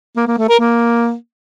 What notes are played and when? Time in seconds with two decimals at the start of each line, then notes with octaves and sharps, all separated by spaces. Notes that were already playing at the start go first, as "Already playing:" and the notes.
0.17 A#3
0.28 A#3
0.38 A3
0.49 A#4
0.60 A#3